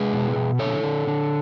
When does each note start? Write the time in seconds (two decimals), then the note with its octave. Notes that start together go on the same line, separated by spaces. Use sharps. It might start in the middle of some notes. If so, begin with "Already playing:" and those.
Already playing: G#3 G#4 B4
0.13 B2
0.36 B2
0.59 D3 A4 C#5
0.83 D3
1.07 D3